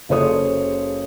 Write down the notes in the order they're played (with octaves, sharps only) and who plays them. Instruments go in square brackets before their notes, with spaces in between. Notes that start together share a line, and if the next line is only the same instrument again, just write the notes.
[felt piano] F#1 C#3 A4 C5 C#5 D#6